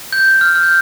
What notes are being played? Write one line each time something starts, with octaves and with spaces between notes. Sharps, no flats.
G6
G6
F6
F6
G6